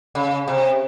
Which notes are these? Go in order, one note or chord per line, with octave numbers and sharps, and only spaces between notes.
C#3
C3